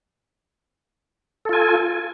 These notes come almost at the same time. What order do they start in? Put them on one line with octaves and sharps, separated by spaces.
A4 F4 G#5